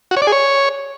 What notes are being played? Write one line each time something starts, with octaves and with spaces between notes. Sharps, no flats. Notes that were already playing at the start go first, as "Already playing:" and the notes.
F#4
C#5
D5
G#4
C#5